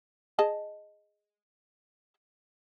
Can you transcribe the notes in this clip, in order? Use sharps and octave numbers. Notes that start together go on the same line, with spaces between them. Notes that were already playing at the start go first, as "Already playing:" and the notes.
G#4 D#5 A5